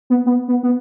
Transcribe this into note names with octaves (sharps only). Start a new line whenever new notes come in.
B3
B3
B3
B3